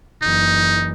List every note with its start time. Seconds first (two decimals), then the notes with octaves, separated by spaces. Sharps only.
0.22 F#1 E3 D#4